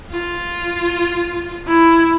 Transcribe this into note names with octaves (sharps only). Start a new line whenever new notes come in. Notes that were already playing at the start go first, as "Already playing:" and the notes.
F4
E4